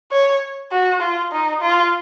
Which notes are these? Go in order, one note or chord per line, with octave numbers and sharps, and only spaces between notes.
C#5
F#4
F4
D#4
F4